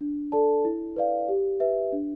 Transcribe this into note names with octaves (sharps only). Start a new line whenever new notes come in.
D4
A4 D5 A5
E4
B4 D5 F5
G4
B4 E5
D4